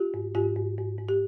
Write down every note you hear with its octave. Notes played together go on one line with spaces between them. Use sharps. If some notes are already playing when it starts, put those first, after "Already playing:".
Already playing: F4 G4
G#2
G#2 F4 G4
G#2
G#2
G#2
G4